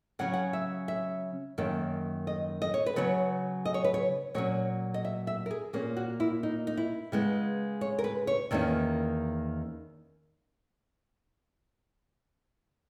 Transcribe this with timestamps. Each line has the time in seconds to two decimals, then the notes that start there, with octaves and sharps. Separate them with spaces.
0.19 C#3 F#3 C#4 F#5
0.34 F#5
0.53 E5
0.88 E5
1.58 F#2 D#3 A#3 C#4
2.27 D#5
2.62 D#5
2.74 C#5
2.86 B4
2.96 C#3 F#3 B3 C#5
3.65 D#5
3.74 C#5
3.84 B4
3.94 C#5
4.34 A#2 F#3 C#4 C#5
4.94 D#5
5.05 E5
5.27 E5
5.46 A#4
5.51 G#4
5.73 A#2 A#3 C#4 G#4
5.97 F#4
6.20 E4
6.43 D#4
6.67 D#4
6.77 E4
7.12 C#3 G#3 B3
7.81 C#5
7.99 A#4
8.04 B4
8.27 C#5
8.51 E2 D#3 A#3 C#4